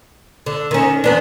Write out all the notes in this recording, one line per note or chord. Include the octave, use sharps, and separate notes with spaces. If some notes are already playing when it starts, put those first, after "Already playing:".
D3
D#3 C#4
E2 B3 D4